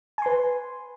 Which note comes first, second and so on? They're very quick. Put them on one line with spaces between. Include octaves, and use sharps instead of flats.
G#5 C6 B4